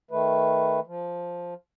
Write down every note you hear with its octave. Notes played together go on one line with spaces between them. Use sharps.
D#3 A3 B4
F3